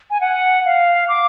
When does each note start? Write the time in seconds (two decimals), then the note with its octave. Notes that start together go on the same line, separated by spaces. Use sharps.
0.10 G#5
0.21 F#5
0.65 F5
1.08 D6